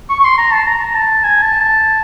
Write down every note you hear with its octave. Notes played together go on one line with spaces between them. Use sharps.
C#6
C#6
C6
A#5
A5
A#5
A5
G#5
A5
A5